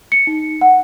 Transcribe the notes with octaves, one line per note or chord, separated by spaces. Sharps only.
C#7
D#4
F#5